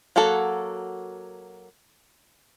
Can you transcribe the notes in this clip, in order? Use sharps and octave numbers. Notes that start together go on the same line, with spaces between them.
F#3 A#3 F#4 A4